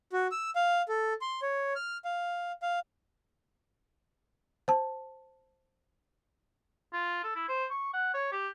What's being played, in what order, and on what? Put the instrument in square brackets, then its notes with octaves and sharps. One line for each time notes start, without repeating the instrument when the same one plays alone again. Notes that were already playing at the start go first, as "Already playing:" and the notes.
[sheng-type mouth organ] F#4
E6
F5
A4
C6
C#5
F6
F5
F5
[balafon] C5 A5
[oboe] F4
A4
E4
C5
C#6
F#5
C#5
G4